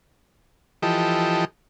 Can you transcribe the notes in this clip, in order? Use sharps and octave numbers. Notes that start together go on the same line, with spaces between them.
E3 F3 G4 A4 D#5